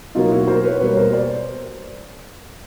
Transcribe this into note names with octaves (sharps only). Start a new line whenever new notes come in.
B2 F#3 A#3 D#4 F4
E4 F#4
A#4 C5
B4 C#5
B2 G3 A#3 B4 C#5
A#4 C5
C5 D5